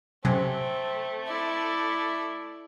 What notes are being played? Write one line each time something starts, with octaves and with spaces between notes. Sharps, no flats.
C3 F#3 A3 C4 C#4
E4 D5